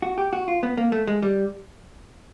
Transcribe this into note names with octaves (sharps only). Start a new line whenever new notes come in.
F#4
G4
F#4
F4
B3
A#3
A3
G#3
G3